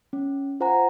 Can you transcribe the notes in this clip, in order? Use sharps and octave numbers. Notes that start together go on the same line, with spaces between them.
C#4
F4 C5 F#5 G#5 A#5